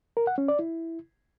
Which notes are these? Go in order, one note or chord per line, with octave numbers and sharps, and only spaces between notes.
A#4
F#5
C#4
D5
E4